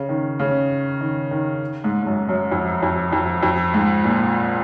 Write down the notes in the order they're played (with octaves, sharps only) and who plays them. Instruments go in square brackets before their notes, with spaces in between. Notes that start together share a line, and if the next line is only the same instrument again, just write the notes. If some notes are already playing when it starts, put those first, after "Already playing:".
Already playing: [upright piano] C#3
D#3
C#3
D#3
D#3
G#2
G#2
F#2
F#2
F2
F2
F2
F2
G#2
A#2